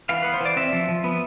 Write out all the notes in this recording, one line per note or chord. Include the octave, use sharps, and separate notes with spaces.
E3 F5
B3 B4
C5
E3 D5
C4 E5
F3
F3
B3